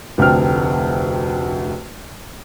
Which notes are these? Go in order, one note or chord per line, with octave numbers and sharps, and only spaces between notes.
F1 D2 G5 F6